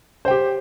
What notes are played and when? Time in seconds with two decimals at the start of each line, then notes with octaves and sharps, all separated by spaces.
0.25 C5
0.28 G5
0.31 G4